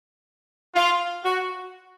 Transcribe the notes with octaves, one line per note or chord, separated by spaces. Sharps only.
F4
F#4